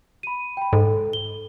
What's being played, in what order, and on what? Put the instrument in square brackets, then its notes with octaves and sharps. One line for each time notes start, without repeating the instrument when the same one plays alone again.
[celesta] B5 D#7
G5 B5
[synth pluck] G#2 [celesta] A4
[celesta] G7